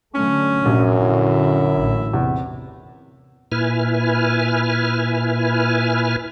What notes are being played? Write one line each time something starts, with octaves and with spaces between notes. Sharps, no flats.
D3 F#3 A3 C#4
A#1 F#2 C3
D3 E4
A1
E2 C3
A#2 E4 B4 G#5 F6